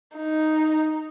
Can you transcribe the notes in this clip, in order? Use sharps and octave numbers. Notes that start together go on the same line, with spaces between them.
D#4